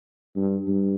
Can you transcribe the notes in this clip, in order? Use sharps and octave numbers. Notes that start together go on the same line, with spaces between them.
G2
G2